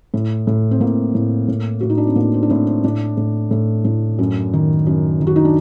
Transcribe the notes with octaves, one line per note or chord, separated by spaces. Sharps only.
A2
A2
C4
A2 A#3
A2
A2
A2 F#4
D#4
D4
C4
A2 A#3
C4
D4
A2 C4
C4
A2 D4
A2
A2
A2
F#2
D#3
F#2
D#3
F#4
D#4
D4